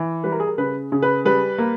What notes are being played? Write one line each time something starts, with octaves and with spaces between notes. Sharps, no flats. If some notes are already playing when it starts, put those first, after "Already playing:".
Already playing: E3
G3 B4
A#4
G#4
A#4
C#3 B4
C#3
B4
G3 B4
A#3